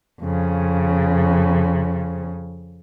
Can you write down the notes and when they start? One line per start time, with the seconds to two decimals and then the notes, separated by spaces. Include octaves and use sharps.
0.20 F2 C#3